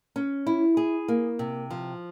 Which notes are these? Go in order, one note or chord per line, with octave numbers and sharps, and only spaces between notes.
C#4
E4
G#4
A#3
C3
F3